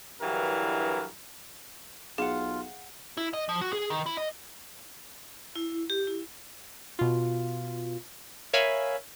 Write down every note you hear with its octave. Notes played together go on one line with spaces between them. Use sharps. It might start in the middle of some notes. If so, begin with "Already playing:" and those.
G2 D3 E3 F#3 E4 A#4
B1 F4 G#4 F5 F#5
E4
D#5
F3
F#4
G#4
D#3
E4
D#5
E4
G4
E4
B2 F4
A#4 C#5 E5 F5 G#5 B5